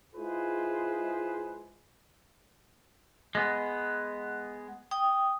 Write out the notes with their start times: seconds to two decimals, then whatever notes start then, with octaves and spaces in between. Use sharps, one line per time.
0.15 G#3 E4 F4 G#4 B4 C5
3.35 G#3 B3
4.91 G5 D#6